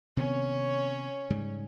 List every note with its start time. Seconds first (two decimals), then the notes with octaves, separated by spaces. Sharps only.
0.17 C3 D#3 B3 C#4 C#5
1.30 G#2 C#3 G3